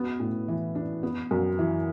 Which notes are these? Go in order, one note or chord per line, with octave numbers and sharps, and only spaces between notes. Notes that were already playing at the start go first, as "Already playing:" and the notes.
Already playing: B3 F#4
A2
E3
D4
B3
F#2
E3